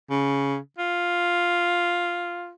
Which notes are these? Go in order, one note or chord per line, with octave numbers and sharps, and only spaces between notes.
C#3
F4